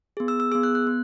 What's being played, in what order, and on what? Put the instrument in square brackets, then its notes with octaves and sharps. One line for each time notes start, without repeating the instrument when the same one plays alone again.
[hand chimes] B3 G#4
E6
E6
B3 G#4 E6
F#6
F#6
B3